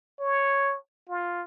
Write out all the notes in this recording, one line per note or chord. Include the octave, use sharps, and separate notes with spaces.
C#5
F4